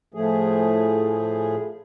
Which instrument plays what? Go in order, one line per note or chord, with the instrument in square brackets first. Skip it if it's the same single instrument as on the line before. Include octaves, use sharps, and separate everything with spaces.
[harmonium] A2 F3 A3 G#4